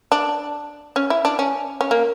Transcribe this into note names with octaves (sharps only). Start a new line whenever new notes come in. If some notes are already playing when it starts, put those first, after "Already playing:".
D4
C#4
E4
D4
C#4
C#4
A#3